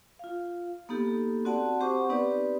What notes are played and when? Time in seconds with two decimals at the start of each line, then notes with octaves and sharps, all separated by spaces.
0.19 F4 F5
0.89 A#3 B3 D#4 G4 A4
1.45 C4 F#4 D5 F#5 A5
1.80 C4 G4 C5 F#5 C#6 D6
2.09 B3 C4 D#4 G4 B4 D5